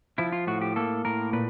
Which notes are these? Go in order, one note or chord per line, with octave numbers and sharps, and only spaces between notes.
F3 E4
F4
A2 F#4
G4
A#3 A4
A2 A#4
A#2 B4